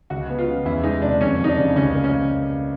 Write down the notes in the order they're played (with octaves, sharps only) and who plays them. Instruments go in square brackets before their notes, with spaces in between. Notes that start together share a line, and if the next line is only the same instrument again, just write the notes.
[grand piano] C#2 [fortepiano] F#4
[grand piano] B3
[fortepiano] F4
[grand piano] C#3
[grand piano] E2 [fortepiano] E4
[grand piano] G#3 [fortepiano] D#4
[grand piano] C3 [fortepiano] D4
[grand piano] F2 [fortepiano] C#4
[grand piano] F2 [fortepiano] D#4
[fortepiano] D4
[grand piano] C#3
[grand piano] C#2 [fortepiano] C#4
[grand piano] A#3
[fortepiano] C#4
[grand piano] C#3